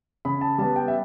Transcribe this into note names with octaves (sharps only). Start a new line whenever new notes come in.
C#3 B5
A5
G3 B3 A5
G5
E5